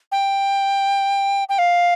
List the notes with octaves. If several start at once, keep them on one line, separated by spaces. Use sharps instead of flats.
G5
G5
F5